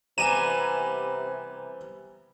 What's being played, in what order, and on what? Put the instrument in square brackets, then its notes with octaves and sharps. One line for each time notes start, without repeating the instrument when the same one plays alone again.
[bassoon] C3 [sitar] E3 G3 B3 [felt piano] G#5 A#5 [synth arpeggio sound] D#7 E7